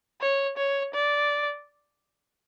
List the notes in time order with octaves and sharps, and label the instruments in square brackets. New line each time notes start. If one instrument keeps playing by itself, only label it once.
[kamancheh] C#5
C#5
D5